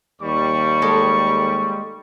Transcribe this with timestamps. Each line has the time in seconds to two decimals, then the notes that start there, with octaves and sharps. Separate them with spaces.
0.21 D#2 G3 C#6
0.82 G#3 A4